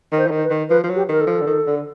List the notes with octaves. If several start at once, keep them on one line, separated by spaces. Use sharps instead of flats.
D#3
C5
E3
D#3
B4
D#3
F3 B4
F3
F#3
G4
D#3 A#4
A4
F3
D3
D#3
D3